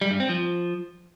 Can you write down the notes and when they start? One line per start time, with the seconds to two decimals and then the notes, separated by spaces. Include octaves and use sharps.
0.01 G3
0.11 G2
0.20 C4
0.29 F3